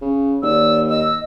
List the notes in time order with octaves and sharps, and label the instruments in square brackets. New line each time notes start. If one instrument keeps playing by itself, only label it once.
[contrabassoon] C#3
[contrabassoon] D#2 [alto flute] D5 [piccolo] E6
[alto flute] D#5 [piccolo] E6